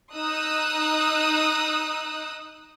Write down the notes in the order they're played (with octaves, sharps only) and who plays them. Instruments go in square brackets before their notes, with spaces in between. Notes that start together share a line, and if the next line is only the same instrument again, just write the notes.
[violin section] D#4 D#6 E6 F#6